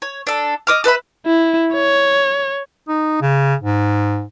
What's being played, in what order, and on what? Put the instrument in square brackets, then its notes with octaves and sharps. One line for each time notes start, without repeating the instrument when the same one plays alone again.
[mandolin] C#5
D4 A4
D#5 D6 F6
A4 B4 E5 B5
[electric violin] E4
C#5
[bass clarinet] D#4
C#3
G#2